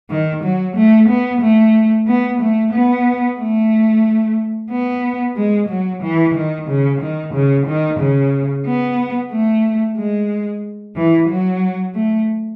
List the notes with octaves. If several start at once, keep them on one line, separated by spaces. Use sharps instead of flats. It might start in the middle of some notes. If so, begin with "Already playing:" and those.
D#3
F#3
A3
B3
A3
B3
A3
B3
A3
B3
G#3
F#3
E3
D#3
C#3
D#3
C#3
D#3
C#3
B3
A3
G#3
E3
F#3
A3